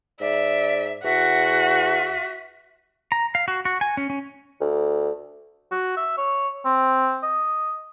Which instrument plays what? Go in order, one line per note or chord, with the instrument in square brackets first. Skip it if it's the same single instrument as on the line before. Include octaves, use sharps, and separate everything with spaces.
[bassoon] G#2 [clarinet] D5 [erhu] E5
[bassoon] E2 [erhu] F#4 [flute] E5 [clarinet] F#5
[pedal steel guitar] A#5
F5
F#4
F#4
G#5
C#4
C#4
[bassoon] D2
[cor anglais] F#4
E5
C#5
C4
D#5